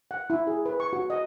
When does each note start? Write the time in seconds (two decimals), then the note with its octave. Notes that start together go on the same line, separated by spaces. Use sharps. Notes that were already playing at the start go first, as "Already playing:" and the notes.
0.11 F#5
0.30 E4
0.47 G#4
0.66 B4
0.80 C#6
0.93 F#4
1.10 D#5